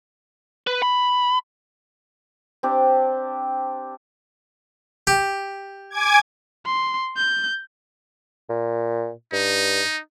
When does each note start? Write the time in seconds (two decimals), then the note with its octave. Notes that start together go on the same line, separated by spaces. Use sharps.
0.67 B4
0.82 B5
2.63 C4 D4 G4
5.07 G4
5.90 G#5 D6 G#6
6.65 C6
7.17 G6
8.49 A#2
9.33 G2 D#4